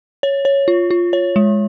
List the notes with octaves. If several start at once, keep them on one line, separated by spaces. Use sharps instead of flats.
C#5
C#5
F4
F4
C#5
G#3